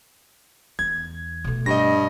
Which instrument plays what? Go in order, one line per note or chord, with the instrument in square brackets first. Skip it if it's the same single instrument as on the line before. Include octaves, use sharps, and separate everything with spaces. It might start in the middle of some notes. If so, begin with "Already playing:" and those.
[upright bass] E2 [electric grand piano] G#6
[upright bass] B2 A3
[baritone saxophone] G2 [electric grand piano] D#5 A#6